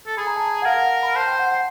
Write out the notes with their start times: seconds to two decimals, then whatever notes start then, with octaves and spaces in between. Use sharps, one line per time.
0.06 A4
0.17 G#4 B5
0.27 A#5
0.36 A5
0.46 A#5
0.62 F#5
0.66 A#4 F5
0.78 F#5
1.03 B5
1.15 C5 A5
1.27 G5
1.39 F#5
1.52 F#5